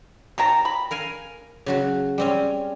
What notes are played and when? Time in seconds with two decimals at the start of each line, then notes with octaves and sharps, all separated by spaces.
0.38 D#3 C#5 G5 A5 A#5
0.65 B5
0.91 A#4 F5 G#5
1.66 C#3 F#3 F#4
2.18 G3 C4 C#4